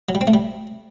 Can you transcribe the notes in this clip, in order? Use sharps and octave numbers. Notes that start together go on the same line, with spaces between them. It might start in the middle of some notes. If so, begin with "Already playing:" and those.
F#3
G3
C4
A3
G3